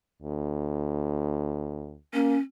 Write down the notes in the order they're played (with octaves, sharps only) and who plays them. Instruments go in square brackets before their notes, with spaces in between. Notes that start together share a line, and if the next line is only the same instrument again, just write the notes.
[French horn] D2
[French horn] A#3 [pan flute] C#4